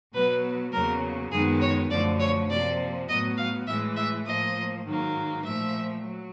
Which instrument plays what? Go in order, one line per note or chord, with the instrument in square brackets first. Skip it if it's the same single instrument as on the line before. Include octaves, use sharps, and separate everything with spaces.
[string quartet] B2 F#3 B3 B4
E2 C#3 F#3 A#3 A#4
F#2 D#3 G#3 B3 G#4
C#5
F#2 D3 F3 A3 D5
C#5
C3 F3 A#3 D5
A2 F#3 B3 D#5
F5
A2 E3 G#3 E5
E5
A2 F3 A#3 D#5
G#2 D#3 F#3 A#3
A#2 F3 A3 E5
F#3